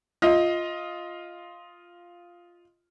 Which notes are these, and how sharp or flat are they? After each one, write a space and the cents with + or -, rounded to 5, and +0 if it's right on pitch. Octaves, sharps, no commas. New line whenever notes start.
F4 +0 D#5 +15